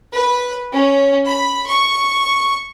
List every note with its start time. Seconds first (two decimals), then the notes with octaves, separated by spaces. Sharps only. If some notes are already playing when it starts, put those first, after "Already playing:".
0.15 B4
0.74 C#4
1.26 B5
1.67 C#6